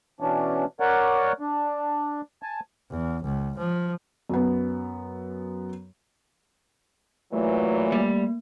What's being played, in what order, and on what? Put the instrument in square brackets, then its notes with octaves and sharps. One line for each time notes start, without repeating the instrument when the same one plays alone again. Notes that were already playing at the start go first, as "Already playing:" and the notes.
[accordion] B2 E3 C#4 D4
A#4 C#5 D5 F#5
D4
G#5 A5
[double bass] E2
C#2
F3
[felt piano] F#2 B3
[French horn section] A#2 E3 F#3 [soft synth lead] A3
[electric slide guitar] G3 [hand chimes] A#3